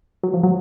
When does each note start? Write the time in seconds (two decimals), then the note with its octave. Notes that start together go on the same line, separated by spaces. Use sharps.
0.23 F#3
0.34 F3
0.43 F#3